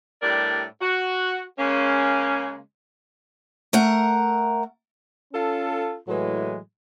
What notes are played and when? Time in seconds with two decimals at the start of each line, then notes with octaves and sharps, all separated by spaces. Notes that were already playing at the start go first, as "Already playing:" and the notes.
0.22 A2 G3 D4 G4 A#4 D5
0.81 F#4
1.59 C#3 G#3 A#3 C#4
3.73 A3 A#4 F#5 A#5
5.33 C#4 F4 A4
6.08 A2 E3 F#3 G#3